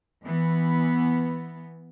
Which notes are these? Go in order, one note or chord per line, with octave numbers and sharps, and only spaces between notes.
E3 B3